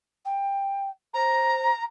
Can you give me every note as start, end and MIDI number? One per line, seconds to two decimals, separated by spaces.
0.25 0.89 79
1.14 1.69 72
1.14 1.84 82